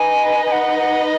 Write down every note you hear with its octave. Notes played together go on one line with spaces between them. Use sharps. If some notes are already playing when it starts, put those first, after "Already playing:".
Already playing: D#4 B4 D#5 G#5
G#5
F#5
F#5